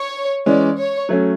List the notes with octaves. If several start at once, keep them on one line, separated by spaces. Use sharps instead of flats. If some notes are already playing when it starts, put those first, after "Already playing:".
Already playing: C#5
E3 G#3 C#4 D5
C#5
F#3 A3 C#4